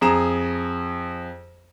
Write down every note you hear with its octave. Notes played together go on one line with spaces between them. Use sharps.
F2 G#4 A#5 E7